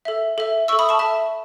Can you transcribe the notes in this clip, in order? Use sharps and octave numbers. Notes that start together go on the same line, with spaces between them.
A4 E5
A4 E5
A4 E5 C#6 E6
B5 D#6
A5 C#6
A4 E5 A5